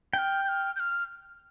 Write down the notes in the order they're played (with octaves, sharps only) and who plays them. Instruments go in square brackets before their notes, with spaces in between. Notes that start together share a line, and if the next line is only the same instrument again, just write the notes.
[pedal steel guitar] G5 [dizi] G6
[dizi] F6
G6
F6
G6
F6